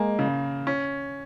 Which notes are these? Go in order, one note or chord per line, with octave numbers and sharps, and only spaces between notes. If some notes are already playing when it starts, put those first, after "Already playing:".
Already playing: G#3 A#3
C#3
C#4